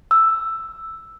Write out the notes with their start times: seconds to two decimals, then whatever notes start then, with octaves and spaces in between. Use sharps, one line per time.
0.11 E6